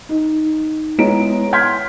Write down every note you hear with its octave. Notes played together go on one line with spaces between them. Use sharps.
D#4
G#3 B3 E4 C#5 A#5 D7
C6 F6 G6 G#6 B6